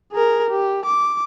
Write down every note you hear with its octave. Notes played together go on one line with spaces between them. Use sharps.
G#4 A#4
G4
D6